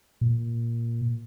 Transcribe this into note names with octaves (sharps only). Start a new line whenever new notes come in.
A#2